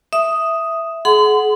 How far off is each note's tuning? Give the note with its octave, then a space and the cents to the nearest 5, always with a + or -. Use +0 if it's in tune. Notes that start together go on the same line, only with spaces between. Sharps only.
E5 +0 D#6 +0
G#4 +35 F#5 +0 C6 -40